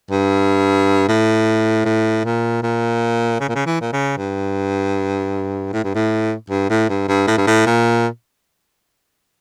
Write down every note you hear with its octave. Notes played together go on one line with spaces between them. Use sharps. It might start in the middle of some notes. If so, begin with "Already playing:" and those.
G2
A2
A2
A#2
A#2
C#3
A#2
C#3
E3
A#2
C#3
G2
A2
G2
A2
G2
A2
G2
G2
A2
G2
A2
A#2